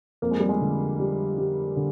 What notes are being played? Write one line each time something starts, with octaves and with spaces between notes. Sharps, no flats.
F2 A#3
G#3
G3
G#3
D3
G3
G3
D3